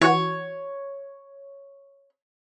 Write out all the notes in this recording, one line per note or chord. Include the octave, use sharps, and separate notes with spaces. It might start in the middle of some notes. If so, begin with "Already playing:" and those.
E3 F#4 C#5